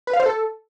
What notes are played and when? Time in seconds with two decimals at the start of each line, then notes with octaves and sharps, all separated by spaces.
0.07 B4
0.13 F5
0.20 C5
0.26 A4